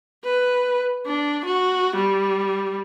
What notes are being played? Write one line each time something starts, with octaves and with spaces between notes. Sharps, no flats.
B4
D4
F#4
G3